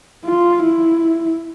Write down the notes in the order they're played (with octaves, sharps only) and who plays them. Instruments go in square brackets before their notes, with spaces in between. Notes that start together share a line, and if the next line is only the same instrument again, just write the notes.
[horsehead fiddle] F4
E4